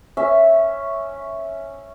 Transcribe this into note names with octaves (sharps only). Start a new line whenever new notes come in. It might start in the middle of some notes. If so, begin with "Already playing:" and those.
C#4 E5